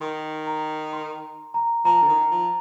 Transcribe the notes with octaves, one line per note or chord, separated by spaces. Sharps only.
D#3 C6
A#5
C6
A#5
F3 A#5
D3
D#3
F3